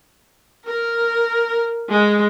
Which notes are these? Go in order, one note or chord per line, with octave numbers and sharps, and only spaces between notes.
A#4
G#3